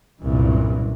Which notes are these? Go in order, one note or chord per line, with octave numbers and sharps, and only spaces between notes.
F#1 C2 G2 A#2 E3